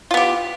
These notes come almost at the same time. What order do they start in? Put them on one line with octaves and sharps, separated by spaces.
F4 B3 G4